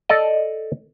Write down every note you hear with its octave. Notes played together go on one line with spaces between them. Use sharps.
A4 D5 D#5